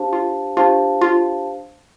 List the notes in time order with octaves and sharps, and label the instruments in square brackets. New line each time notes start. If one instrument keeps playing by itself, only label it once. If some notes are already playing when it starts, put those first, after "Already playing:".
Already playing: [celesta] D4 G4 C5 F5 A5
[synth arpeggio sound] F4
[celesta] D4 G4 C5 F5 A5 [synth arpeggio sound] F4
[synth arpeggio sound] F4